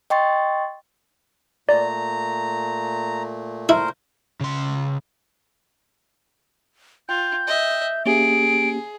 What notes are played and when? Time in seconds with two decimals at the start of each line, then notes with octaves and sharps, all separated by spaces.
0.10 D#5 G5 C6 C#6 A6
1.69 A#2 A3 D5 A#5
3.69 E4 A#4 C5
4.41 C#3 C6
7.09 F4 G5 G6
7.47 D#5 E5
8.06 A#3 C#4 G4 G#4 D7